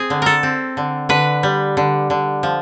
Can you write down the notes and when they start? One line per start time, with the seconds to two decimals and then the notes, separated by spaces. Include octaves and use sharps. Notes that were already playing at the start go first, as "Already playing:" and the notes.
Already playing: C4 G#4
0.10 D3
0.22 A4 A#4
0.43 C4
0.77 D3
1.09 D3 B4
1.43 G3
1.77 D3
2.10 D3
2.43 F3